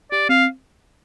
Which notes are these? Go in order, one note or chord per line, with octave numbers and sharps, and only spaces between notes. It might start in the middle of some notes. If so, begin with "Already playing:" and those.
G4 D5
C4 F5